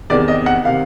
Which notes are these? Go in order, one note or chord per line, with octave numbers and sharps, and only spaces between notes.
E2 C3 D#3 D5
D#5
F#5
C3 D#3 F5